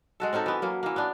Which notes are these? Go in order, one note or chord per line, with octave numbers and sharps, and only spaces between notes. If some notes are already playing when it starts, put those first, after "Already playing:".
G#3 F#4 A4
C4 C#4 D#4 A4
E3 B3
F#3 A#3
E3 A#3
B3 D4